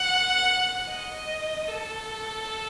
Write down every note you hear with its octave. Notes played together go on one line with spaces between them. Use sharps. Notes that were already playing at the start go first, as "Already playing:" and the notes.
Already playing: F#5
D#5
A4